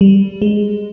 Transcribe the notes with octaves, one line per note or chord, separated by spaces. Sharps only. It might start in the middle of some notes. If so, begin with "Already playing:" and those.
G3
G#3